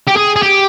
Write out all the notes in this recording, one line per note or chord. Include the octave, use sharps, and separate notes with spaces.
G4
G#4
G#4
G4